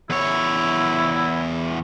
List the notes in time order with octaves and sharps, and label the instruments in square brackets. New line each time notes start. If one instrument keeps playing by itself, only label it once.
[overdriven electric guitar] E2 C#5 [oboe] E4